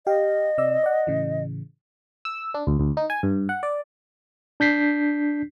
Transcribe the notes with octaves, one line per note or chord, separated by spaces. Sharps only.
G4 D#5 F5 G5
C3 D5 E6
D5 F#5
A2 C#3 E3
E6
D4
D2
D2
D#4
G#5
G2
F#5
D5
D4 G6 B6 C7